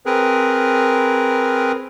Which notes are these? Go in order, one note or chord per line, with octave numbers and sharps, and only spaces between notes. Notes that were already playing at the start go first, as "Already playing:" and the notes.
C4 G#4 A#4 B4